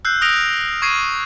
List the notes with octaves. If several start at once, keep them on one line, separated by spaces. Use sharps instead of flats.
E6 F#6 G6 C7
D#6 F6 A#6 D7 F7
C#6 G#6 C7 D#7